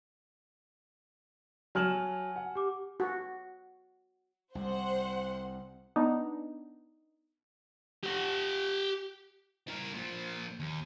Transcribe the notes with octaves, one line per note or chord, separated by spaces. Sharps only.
F#3 G#5 A5 F6 E7 F#7
F#5
G4 D6
F#4
C2 C5 F#5
B3 D4 D#4
G4 F#5
E4 A#4
A#2 F3
D#2